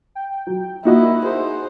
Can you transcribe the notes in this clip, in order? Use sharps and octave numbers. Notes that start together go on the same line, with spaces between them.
G5
F#3
A#3 D#4 E4 F#4 D#5
G#4 C5